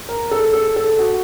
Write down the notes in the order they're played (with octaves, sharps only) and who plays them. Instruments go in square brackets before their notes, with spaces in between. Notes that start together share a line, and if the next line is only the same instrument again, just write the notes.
[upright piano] A#4
A4
A4
A4
F#4